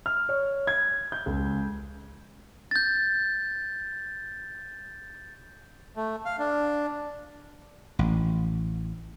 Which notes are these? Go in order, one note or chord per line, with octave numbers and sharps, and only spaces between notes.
F6
C#5
G#6
G6
C#2
G6 A6
A3
F5
D4
A1